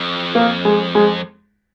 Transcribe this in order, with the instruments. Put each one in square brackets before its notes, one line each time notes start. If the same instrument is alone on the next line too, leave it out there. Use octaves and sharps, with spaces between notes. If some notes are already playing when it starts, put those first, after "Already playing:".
Already playing: [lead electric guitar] F2
[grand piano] A#3
G#3
G#3